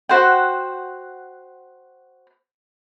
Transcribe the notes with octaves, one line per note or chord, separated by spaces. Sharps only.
F#4 C5 F#5 G5